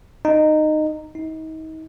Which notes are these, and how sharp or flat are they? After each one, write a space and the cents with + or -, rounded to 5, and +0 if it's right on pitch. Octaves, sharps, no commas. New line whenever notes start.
D#4 -15
D#4 +35